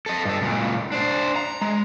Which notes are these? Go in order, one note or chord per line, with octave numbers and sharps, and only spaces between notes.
A4 D#5
G2 A4
C#2 A#2
D4 C5
A#5
G#3